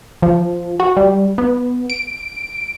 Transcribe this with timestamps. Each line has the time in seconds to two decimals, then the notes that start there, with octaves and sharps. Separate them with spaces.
0.22 F3
0.80 F#4
0.97 G3
1.38 B3
1.90 D7